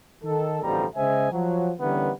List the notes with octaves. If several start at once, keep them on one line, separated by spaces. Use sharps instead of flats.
D#3 A4
A1 B2 D3 F3 G3 A#5
C#3 G#3 C5 D#5 E5 G#5
F3 F#3
D3 E3 G3 A#3 B3 C#4